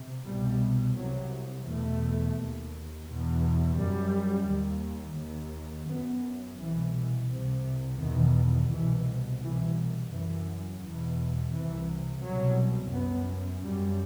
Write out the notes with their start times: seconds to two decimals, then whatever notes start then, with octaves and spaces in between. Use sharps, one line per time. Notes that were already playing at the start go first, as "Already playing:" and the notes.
Already playing: C3
0.25 C2 B2 G3
0.96 C2 C3 F#3
1.66 E2 B2 A3
2.36 D#2
3.07 E2 B2
3.77 F#2 G3
4.48 D#2
5.18 D#2
5.88 F#2 B3
6.59 C2 B2 E3
7.29 C2 C3
8.00 E2 B2 D#3
8.70 C2 B2 E3
9.41 C2 B2 E3
10.11 F#2 E3
10.82 E2 B2
11.52 C2 C3 E3
12.22 C2 B2 F#3
12.93 F#2 B3
13.63 F#2 G3